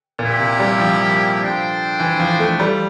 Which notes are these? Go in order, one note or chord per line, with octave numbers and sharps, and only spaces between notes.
A#2 A#3 E4 G4
C3
G3
F3
D4 A4 C5 G5
E3
F3
A3
G3